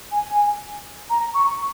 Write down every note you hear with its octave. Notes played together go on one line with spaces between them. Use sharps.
G#5
A#5
C#6